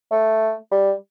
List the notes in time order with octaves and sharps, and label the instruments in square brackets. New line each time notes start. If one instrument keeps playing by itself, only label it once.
[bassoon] A3
G3